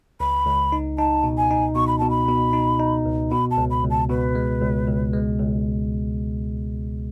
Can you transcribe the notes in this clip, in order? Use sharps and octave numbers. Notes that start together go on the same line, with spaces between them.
C#2 B5
C#2
D#4
D#4 A5
B2
G#5
D#4
B2 C#6
B5
B2 A5
B5
B2
D#4
D#4
C#2
B2 B5
A5
C#2
B5
C#2
A5
B2 B4
G#3
C#2
C#2
G#3
C#2